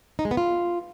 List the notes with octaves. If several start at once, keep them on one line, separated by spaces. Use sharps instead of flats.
D#4
G#3
B3
F4